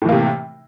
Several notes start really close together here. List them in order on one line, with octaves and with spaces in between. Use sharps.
A2 E3 A#3 C3